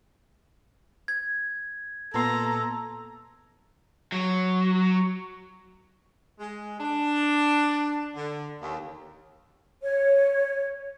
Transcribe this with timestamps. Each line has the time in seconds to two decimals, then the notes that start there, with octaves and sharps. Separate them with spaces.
1.08 G#6
2.14 A#2 B3 A4 A#5 C6
4.12 F#3
6.40 G#3
6.80 D4
8.15 D3
8.62 D#2
9.82 C#5